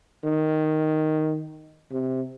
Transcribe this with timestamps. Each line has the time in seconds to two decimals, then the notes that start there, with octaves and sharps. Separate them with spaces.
0.24 D#3
1.92 C3